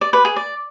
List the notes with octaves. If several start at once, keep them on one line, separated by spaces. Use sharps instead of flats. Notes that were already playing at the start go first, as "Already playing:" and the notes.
D5
B4
G#4
D5